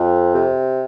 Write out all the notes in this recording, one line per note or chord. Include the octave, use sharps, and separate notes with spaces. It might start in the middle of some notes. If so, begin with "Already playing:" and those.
Already playing: F2
C3